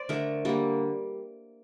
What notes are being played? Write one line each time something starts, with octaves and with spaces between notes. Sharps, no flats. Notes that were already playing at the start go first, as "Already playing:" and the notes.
Already playing: C5 D5
D3 A3 A#4
D3 G3 A#3